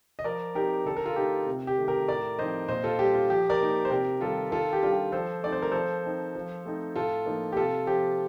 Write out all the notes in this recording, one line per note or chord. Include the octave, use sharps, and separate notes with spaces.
D#5
F3 A#4 D5
C4 D#4 G4 A#4
D3 A4
A#4
F4 A4
A3 D#4 G4
C3
G4
D#3 A3
G4 A#4
A2 A#4 D5
F3 C4 D#4 C5 D#5
A#2 C5 D#5
F4 A4
G3 D4 G4
F4
F3 G4
A#4 D5
A#3 D#4
C5
C3 G4 A#4
D#3 G3 F4 A4
D#3 F4 A4
G4
G3 D4 F4
G4
F3 A4 C5
A3 C4 D#4 D5
C5
A#4
F3 A4 C5
C4 D#4
F3
A3 C4 D#4
A2 F4 A4
F3 A#3 D#4
G4
C3 F4 A4
F3 C4 G4